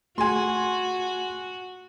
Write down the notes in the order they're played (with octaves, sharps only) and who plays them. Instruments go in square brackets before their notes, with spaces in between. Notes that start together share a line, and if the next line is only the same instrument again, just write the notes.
[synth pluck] A3 G#4 G#6 [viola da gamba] F#4 [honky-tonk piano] G#5 C6